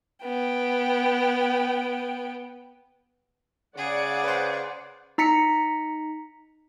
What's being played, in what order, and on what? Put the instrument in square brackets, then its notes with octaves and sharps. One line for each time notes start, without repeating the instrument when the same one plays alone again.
[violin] B3 G5
[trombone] C#3 [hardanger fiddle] G#4 [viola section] D5 F#5
[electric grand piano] B4 C5
[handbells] D#4 A#5 B6 C#7